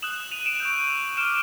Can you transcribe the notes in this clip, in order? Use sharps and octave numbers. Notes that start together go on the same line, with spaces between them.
D#6 F#6 E7 F#7
D#7 F7
D7 E7
C#6 E6 G6
D6 F6 D7 E7